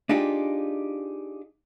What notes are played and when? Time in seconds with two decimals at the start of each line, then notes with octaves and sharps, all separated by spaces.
0.09 D4 D#4 F4 G4 G#4